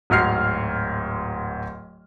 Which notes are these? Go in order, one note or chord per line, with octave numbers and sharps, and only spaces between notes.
D1 G#2 F#4 F6 C7